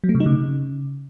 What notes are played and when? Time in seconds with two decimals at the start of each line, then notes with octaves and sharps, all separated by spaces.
0.04 F#3
0.09 A3
0.15 C3
0.20 D#4
0.26 C#3